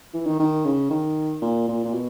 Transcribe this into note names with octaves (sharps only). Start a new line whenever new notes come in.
E3
D#3
D#3
C#3
D#3
A#2
A#2
A#2
B2